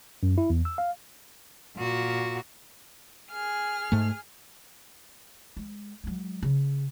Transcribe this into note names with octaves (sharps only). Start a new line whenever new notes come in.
F#2
E4
E2
E6
F5
A#2 F#4
G#4 F6
G#2 A3
G#3
F#3 G#3
C#3